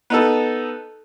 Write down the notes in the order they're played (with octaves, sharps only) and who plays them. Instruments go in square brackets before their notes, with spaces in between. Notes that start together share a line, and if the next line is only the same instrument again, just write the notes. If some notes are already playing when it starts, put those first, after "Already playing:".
[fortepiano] B3 D#4 A4